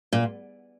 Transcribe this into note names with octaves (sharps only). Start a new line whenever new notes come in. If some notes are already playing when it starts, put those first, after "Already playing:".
A#2